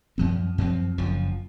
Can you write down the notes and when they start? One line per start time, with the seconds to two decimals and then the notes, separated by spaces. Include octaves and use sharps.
0.18 F#2 F3 C4
0.58 F#2 F3 C4
0.98 F#1 F#2 F3